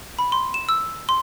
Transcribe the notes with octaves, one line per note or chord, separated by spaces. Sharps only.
B5
C6
E7
E6
C6